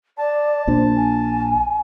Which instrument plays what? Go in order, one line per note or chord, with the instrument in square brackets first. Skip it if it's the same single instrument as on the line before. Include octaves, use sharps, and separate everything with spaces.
[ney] D5 [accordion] A5
[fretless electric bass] A#1 A#2 D4 [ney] C5
[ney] G#5